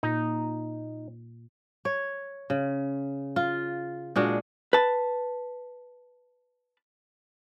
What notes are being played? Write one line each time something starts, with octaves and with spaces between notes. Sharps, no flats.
A#2 D#4
C#5
C#3
F4
A#2 G#3 D4 F#4
B4 A5